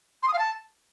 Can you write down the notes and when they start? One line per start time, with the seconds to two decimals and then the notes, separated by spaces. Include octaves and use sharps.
0.23 C6
0.28 D#6
0.33 F5
0.39 A5